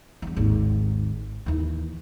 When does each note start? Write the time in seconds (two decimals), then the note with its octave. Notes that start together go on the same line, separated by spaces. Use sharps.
0.22 E2 G2
0.37 G#1 D#2
1.46 D#2 E3